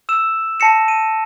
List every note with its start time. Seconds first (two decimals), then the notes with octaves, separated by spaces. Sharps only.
0.09 E6 E7
0.60 A5 A#6 C#7 E7
0.88 D#7